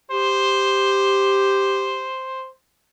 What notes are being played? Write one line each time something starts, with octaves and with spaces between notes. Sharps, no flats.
G4 C5